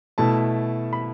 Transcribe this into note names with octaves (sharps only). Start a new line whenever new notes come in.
B2 A3 E4 A5
B5